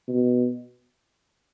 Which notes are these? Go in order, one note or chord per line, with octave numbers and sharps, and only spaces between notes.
B2